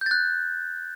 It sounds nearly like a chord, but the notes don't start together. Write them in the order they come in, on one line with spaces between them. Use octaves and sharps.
G6 A6 F#6